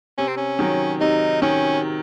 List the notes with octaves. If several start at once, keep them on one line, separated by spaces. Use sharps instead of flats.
C3 C#4
C4
C#4
D#3 F#3
C3 D#4
D#3 C#4